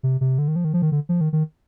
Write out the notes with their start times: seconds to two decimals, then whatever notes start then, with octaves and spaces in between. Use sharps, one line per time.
0.03 C3
0.21 C3
0.38 D3
0.48 D#3
0.56 F3
0.65 D#3
0.74 F3
0.82 D#3
0.92 D3
1.09 F3
1.21 D#3
1.33 D#3